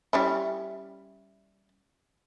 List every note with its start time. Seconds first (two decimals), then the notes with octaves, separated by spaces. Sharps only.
0.13 G3 C#4 E4